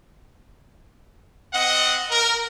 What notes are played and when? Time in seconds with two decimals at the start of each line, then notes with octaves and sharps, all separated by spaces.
1.54 C4 D#5 F#5
2.10 A#4